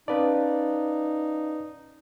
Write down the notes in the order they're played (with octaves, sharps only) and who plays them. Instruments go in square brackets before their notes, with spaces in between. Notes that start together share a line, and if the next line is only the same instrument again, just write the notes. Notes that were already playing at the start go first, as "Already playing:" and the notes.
[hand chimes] C#4 F5 A5 [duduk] D#4 [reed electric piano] B4 D5